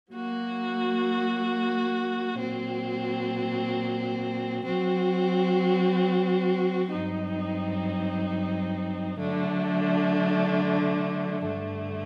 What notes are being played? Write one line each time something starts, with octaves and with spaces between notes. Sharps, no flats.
F#3 A#3 F#4
A#2 F#3 C4
F#3 C4 F#4
G2 F#3 C4 D#4
D3 F#3 A3 D4
G2 D3 A3